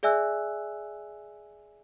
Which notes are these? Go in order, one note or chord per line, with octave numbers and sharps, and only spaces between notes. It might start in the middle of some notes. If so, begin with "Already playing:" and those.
G#4 D5 E5 G#5 E6 F#6